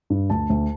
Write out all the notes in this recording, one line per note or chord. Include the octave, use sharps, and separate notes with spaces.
G2
D2 A5
D2